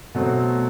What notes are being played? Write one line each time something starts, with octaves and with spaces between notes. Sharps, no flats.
B2 F#3 A3 C4